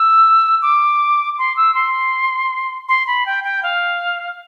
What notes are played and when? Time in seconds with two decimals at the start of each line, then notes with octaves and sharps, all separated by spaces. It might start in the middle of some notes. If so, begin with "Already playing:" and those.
Already playing: E6
0.62 D6
1.38 C6
1.57 E6
1.75 C6
2.89 C6
3.07 B5
3.26 G5
3.44 G5
3.63 F5